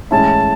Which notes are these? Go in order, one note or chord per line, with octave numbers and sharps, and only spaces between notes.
A2 E3 G#3 C#4 E4 A5